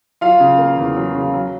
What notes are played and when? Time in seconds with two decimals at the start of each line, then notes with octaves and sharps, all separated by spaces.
0.21 F#3 F4 F5
0.40 C#3
0.58 A#3
0.77 E2
0.96 F#3
1.14 C#3
1.33 F#3